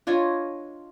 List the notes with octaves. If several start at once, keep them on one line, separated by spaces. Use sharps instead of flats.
D4 F4 C#5 D#5